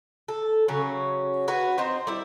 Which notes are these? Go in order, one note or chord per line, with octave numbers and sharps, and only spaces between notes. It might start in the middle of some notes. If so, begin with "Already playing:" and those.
A4
C#3 F#3 C#4
F#4 B4 C#5
C4 D#4 C5
G3 E4